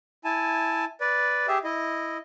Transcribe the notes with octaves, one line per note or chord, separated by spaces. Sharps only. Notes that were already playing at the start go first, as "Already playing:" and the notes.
E4 G#5 A5
B4 D5
G4 G#4 E5
E4 D#5